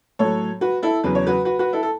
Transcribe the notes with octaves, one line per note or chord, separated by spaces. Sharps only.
A2 F#3 A4 C#5
F#4 B4
E4 A4
E2 C#3 F#3 B4
C#5
F#4 B4
F#4 B4
F#4 B4
E4 A4
A4